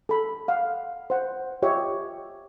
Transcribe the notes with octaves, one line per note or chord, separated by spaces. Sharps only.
A4 B5
F5 F#5
C5 F#5
F4 G4 C#5 D#5 E5